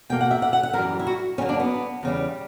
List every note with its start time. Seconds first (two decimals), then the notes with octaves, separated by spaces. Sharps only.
0.10 B2 A#3 G5
0.21 F#5
0.31 E5
0.42 F#5
0.53 F#5
0.63 F#5
0.73 F#2 E3 G3 A#4
0.99 E4
1.07 F#4
1.38 F#2 C#3 F#3 A#3 C#4
1.49 D4
1.60 B3
2.03 E2 C#3 G3